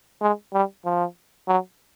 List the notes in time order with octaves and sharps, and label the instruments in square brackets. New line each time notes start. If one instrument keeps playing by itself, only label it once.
[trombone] G#3
G3
F3
F#3